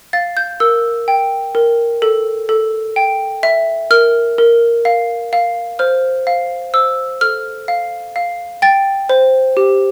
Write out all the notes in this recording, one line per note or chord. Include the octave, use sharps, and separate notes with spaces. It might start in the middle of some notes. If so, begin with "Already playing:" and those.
F5 A6
G6
A#4 E6
G5
A#4
A4
A4
G5
E5
A#4 F6
A#4
F5
F5
C5 F6
F5
C5 E6
A4 F6
F5
F5
G5 A6
C5
G4